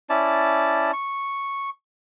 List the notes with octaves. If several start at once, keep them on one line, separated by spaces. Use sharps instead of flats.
C#4 E4 D5 A5
C#6